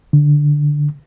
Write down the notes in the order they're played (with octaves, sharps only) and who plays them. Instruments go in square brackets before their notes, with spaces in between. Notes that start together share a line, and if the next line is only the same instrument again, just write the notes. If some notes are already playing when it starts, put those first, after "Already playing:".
[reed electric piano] D3